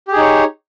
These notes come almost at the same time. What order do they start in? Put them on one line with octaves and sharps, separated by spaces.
G4 G#4 D#4 C#5